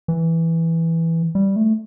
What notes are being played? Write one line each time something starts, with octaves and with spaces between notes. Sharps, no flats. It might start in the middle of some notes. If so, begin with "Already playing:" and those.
E3
G3
A3